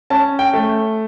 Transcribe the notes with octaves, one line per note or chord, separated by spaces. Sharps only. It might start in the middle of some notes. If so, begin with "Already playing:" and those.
C#4 A5
G5
A3